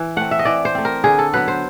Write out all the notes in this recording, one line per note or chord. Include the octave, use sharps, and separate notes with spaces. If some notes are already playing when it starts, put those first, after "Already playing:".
Already playing: E3
A3 C4 F#5
E5
D#5
E3 D5
C5
A3 C4
A#4
D3 G#4
A4
F#3 B3 B4
C5